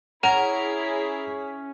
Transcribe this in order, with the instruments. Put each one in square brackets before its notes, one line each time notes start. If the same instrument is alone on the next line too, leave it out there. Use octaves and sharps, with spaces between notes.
[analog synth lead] C#4 [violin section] E4 G#4 B6 [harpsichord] A#4 A#5 [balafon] F#5